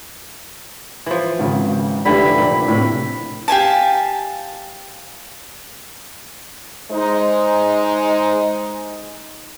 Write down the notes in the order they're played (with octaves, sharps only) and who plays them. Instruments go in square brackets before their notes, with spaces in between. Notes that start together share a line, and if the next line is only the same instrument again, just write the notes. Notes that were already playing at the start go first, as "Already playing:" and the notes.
[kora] E3 F3
[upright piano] G#1 C#3
[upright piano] F1 G4 [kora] D3 E3 [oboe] B5
[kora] A#2
[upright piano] A2 C3
[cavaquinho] G4 F5 G#5 A5
[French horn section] G#3 D#4 C5